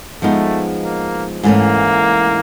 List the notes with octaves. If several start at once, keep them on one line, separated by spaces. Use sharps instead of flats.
F3 G#3 A3 B3 D#4
A#3
G#2 E3 A3 A#3 C#4